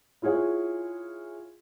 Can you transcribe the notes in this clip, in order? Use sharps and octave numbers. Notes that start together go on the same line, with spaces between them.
E4 F4 G#4 C#5 F#5